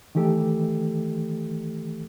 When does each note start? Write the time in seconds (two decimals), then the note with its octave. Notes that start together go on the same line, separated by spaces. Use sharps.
0.15 D#3 E3 A3 G4 A4